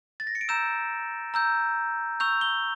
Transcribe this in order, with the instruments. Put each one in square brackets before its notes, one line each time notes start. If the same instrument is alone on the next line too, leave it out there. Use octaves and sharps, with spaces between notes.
[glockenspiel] A6
A#6
C#7
D7
A#5 E6 G6 E7
A#5 E6 G6
C#6 E6 G6 F7
G7